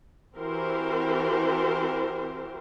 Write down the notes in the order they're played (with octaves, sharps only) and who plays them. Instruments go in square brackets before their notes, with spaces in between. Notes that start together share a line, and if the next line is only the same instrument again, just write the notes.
[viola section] E3 C4 F#4 G4 A#4 C5